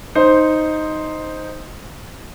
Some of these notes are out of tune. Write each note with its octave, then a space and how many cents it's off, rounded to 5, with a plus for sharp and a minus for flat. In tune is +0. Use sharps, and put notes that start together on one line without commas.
D#4 +0 C5 +0